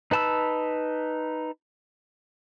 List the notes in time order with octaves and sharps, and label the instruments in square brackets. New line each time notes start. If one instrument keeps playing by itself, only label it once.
[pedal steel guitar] D#4 B4 A5 B5 E6